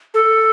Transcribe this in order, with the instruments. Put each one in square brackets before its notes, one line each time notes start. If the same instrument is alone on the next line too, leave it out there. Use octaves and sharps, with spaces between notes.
[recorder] A4